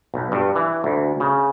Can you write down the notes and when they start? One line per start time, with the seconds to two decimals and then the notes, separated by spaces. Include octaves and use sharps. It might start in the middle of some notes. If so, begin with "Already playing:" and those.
0.14 B1
0.32 G2
0.56 E3
0.84 D2
1.20 C#3